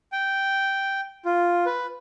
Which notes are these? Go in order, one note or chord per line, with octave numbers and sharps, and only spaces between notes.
G5
F4
B4